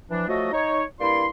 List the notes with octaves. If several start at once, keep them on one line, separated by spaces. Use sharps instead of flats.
E3 F3 D4
F3 F#3 A3 F#4 A4 D#5
D#4 C#5
G2 A#3 E4 D5 C6